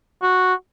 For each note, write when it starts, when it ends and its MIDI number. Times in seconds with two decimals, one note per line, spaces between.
0.23 0.53 66